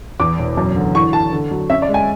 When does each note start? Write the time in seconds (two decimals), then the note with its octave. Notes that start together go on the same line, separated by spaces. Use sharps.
0.20 E2 D6
0.38 E1
0.57 F#2
0.76 D3
0.95 E3 C#6
1.13 E3 A5
1.32 D3
1.51 F#3
1.70 C#4 E5
1.82 D5
1.89 G#3
1.94 G#5